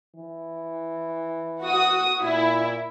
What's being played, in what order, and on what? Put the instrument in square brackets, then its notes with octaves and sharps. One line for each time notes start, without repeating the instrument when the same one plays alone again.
[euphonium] E3
[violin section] F#4 D#6
[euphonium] A#2 [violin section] E4